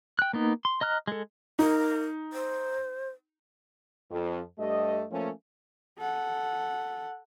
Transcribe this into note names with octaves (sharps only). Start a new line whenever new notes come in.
G5 F#6
A#3 B3 D#4
C6
D#5 A#5 F6 F#6
G#3 A4
D#4 A#4
C5
F2
G2 A3 G4 D#5
F3 A3 A#3 C#4
A4 F#5